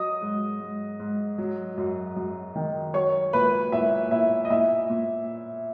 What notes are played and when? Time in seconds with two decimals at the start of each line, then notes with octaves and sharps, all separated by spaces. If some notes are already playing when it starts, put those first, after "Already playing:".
Already playing: F#3 D#5 D#6
0.22 G#2
0.60 G#2
1.00 G#2
1.38 F#3
1.77 F#2
2.16 F#2
2.56 D#3
2.94 F#3 C#5 C#6
3.33 A#2 B4 B5
3.72 A#2 E4 E5
4.11 A#2 E4 E5
4.45 D#5
4.50 A#2 E4 E5
4.90 A#2